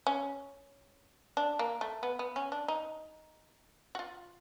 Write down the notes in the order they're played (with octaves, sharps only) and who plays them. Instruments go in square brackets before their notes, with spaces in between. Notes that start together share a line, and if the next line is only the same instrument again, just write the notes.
[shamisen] C#4
D4
A#3
A3
B3
B3
C#4
D4
D#4
F#4
F4